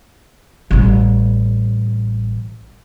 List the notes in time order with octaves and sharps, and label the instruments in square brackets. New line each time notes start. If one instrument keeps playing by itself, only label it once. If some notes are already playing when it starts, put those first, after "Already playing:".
[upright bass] A1 G3